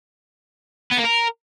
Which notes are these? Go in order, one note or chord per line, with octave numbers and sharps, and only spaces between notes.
B3
A#3
A#4